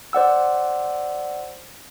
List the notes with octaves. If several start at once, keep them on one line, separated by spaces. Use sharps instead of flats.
C5 D5 F#5 E6